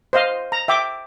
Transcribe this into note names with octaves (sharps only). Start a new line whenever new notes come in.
C5 D#5 F5
A#5
E5 G5 D6